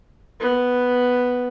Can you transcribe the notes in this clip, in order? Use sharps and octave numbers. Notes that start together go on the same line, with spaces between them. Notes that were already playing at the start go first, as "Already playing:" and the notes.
B3